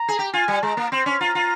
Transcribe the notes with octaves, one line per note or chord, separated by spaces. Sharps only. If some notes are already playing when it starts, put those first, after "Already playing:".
Already playing: A#5
G#4
G4
F4 G#5
G3
G#3 A#5
A#3
C4 C6
C#4
F4 A#5
F4